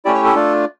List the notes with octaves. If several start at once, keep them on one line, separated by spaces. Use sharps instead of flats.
A3 C#4 E4 G4 D5
C#5
A4
A3 D4 F4